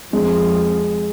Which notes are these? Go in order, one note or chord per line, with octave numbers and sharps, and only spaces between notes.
F2 G#3